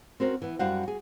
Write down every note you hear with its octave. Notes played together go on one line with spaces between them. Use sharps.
C4 C#4 F#4 A#4 C5
E3 B3
F#2 G3 F#4 C5 F5 F#5
F#4 G#4